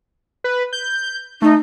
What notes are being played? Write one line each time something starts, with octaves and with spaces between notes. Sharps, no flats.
B4
G6
A3 D#4